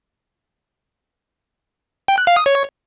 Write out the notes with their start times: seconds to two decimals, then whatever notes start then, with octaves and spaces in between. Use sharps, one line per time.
2.08 G5
2.18 F#6
2.27 F5
2.37 D#6
2.46 C#5